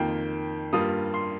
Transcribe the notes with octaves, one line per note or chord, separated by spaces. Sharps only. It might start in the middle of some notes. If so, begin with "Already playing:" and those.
Already playing: F2 D#3 A#3 F4 G5
G2 G3 A#3 F4 D#6
C6